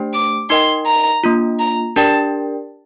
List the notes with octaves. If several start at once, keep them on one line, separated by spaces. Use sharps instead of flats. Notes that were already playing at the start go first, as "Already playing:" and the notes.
Already playing: A3 D4 G4 C5 G5
D6
D#4 A#4 D#5 G5 C6
A#5
A#3 D4 F4
A#5
D4 G4 A#4 D5 G5 A5